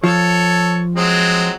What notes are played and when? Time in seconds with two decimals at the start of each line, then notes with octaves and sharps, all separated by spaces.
0.04 F3 A4 C#5
0.95 F#3 G#3 C4